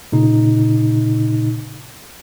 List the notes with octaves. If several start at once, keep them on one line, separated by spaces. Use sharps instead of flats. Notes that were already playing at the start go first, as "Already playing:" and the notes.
A#2 C#3 D#4